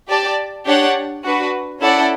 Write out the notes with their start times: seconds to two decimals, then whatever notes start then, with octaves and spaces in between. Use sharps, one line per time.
0.08 G4 D5 A5
0.66 D4 G4 C#5 F#5
1.23 D4 F#4 B4
1.81 C#4 E4 A4 D5 F#5